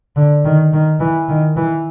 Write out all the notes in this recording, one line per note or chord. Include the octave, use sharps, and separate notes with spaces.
D3
D#3
D#3
E3
D#3
E3